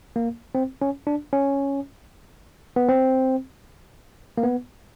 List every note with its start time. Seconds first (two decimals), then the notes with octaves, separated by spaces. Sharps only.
0.16 A#3
0.55 C4
0.82 C#4
1.07 D4
1.33 C#4
2.76 B3
2.88 C4
4.38 A#3
4.44 B3